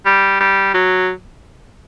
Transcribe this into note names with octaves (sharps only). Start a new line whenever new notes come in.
G3
G3
F#3